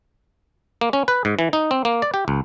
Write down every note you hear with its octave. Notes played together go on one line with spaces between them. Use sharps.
A#3
C#4
B4
G#2
E3
D#4
C4
A#3
D5
G4
C#2